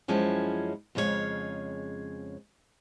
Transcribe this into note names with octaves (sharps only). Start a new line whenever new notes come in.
F#2 F3 G#3 C#4 E4 A5
F2 C#3 G#3 D#4 C#5 F5